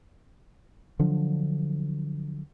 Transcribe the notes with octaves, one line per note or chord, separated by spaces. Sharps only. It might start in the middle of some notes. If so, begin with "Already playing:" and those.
D3 F3 F#3 D4